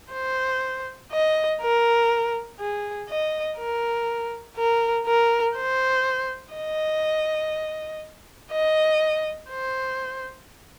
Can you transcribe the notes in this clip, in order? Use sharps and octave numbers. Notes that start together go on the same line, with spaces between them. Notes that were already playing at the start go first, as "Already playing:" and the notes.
C5
D#5
A#4
G#4
D#5
A#4
A#4
A#4
C5
D#5
D#5
C5